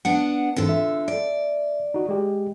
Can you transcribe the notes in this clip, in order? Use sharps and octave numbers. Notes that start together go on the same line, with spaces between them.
B3 D4 F#5
G#2 D3 E3 C4 F4 A4
E5
D5
D#4 F#4
G#3 G4